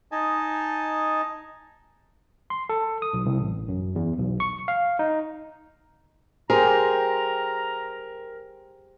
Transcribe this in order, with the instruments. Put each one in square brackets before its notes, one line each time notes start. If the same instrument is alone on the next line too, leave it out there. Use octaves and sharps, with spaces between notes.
[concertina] D#4 D#5 G#5 A5
[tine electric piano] C6
A4
D#6
B1
C2
A1
F#2
E2
B1
C#6
F5
D#4
[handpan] G4 C5 [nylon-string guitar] G#4 [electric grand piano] A#4 [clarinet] A#5